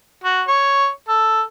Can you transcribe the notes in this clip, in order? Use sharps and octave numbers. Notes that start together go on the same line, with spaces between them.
F#4
C#5
A4